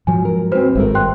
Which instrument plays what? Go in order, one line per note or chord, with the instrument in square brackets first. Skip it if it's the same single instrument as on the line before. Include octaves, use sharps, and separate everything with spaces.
[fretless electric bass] G#2 F3 F#3 [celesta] G#5
[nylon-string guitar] A#4
[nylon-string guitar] D#2 C4 [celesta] F#4 B4 C5
[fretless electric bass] G#1 G2 [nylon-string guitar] G#3 A3 A#4
[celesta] G5 C6 F#6